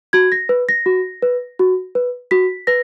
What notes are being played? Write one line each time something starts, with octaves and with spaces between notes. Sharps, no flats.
F#4 G#6
A#6
B4
A#6
F#4
B4
F#4
B4
F#4 B6
B4 A#6